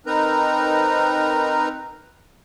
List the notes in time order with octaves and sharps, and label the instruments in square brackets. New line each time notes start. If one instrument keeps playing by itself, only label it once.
[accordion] C4 D#4 A#4 B4 A#5